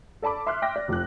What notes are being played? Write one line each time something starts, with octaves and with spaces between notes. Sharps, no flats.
A4 D5 A5 B5 D6
E5 C6 D6 F6 F#6
E5 G5 C6 D6 A#6
D5
F1 F3 F#6